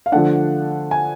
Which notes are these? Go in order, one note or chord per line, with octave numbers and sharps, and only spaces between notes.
F5
D3 F3 A3 D4 F#5
G#5